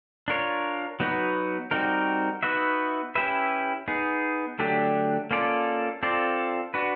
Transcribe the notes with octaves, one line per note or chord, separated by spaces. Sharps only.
D4 F4 A#4 C#5
F#3 B3 D#4 F#4 B4
G3 C4 D#4 F#4 A#4
B3 D#4 F#4 B4 E5
C#4 E4 G4 B4 E5
B3 D#4 G#4
D3 F#3 A3 D4 G4
A#3 C#4 F4 A4 D5
C4 F4 A4 D5
D4 F#4 B4